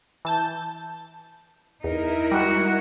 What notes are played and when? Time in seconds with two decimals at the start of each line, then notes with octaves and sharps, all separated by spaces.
0.25 E3 A5 G6
1.84 E2 D#4 E4 A#4
2.31 G3 G#3 F#4